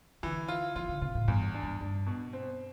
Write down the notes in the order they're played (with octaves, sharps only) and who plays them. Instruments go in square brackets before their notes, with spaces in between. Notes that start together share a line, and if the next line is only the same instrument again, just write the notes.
[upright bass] D3 [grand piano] E3
[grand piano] F4
[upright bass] E3 [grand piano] F4
[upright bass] D3
[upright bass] C3 [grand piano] F4
[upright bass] A2
[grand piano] E2 [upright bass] G2
[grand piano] D4
[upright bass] G2
[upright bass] G2 [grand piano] D4
[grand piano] B2
C4